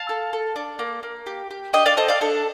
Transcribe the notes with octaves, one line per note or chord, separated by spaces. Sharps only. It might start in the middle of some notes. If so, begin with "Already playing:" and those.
Already playing: F5 A5
A4
A4
D4
A#3
A#3
G4
G4
D4 D#5 G5
D5 F5
A4 C5 D#5
D5 F5
D4 A4